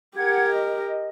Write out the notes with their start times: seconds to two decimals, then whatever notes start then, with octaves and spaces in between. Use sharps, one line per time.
0.17 G4 A#4 F#5 G#6
0.49 D#5